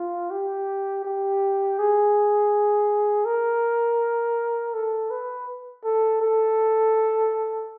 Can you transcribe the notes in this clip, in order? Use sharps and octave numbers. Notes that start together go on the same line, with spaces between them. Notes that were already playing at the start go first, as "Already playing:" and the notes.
Already playing: F4
G4
G4
G#4
A#4
A4
B4
A4
A4